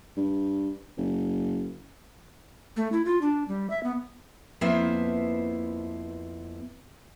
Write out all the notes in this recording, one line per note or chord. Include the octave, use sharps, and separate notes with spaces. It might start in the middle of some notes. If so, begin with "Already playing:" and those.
G2
F#1
A3
E4
F4
D4
G3
E5
B3
F2 A#3 B3 E4 C5 E5